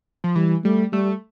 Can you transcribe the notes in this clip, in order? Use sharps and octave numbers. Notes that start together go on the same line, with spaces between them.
F3
E3 G3
G3 A3
G3 A3